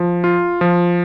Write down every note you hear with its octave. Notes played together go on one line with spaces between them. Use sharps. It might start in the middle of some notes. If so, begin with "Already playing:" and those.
Already playing: F3
F4
F3